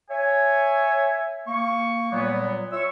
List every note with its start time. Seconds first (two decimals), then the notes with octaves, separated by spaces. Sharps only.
0.11 C#5 E5 G#5
1.48 A#3 C#6
2.13 A#2 F#3 G3 B3
2.72 F4 C#5 E5 C#6 E6